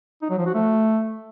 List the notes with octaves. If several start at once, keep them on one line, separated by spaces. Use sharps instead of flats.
D#4
F#3
F3
F#4
A3